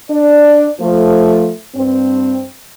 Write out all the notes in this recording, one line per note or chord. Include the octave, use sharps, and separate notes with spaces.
D4 D5
F3 A3
G2 C4